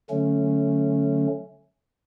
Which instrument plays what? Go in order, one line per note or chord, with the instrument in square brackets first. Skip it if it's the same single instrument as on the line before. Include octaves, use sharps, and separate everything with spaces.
[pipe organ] D3 F#3 A3 C#4